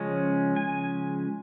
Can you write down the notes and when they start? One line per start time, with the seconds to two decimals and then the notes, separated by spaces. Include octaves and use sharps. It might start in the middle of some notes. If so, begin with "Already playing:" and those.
Already playing: C#3 F3 G#3 C#4
0.56 G#5